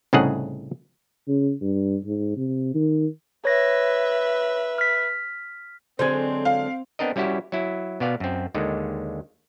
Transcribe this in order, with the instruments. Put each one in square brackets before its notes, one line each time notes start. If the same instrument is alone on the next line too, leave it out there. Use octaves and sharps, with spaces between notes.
[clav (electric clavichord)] C2 A2 C#3 D#4 G#4 F#5
[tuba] C#3
G2
G#2
C3
D#3
[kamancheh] B4 E5 [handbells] C#5 A#6
[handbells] F6 B6
[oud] D3 F#3 G#3 [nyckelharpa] C4 [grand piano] C5 G#6
[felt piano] F5
[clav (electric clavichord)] B3 C4 D4 A#4 D#5
G3 C#4 E4 F#4 G4
F#3 E4
B2 B3 D5 F5
F#2 C4
D#2 D3 D#3 G#3